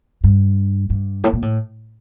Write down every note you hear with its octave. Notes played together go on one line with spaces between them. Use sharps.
G2
G2
A2
A#2
A2